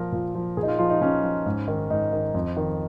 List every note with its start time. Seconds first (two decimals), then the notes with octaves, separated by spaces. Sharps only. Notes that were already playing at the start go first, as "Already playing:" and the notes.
Already playing: A#2 F3 A#4
0.12 A#2
0.35 F3
0.57 A#2 G#4
0.63 D#4
0.68 F4
0.79 F3 F4
0.90 D#4
1.01 A#2 C#4
1.23 F3
1.46 G#2
1.68 D#3
1.90 G#2 D#4
2.12 D#3
2.34 F2
2.57 D#3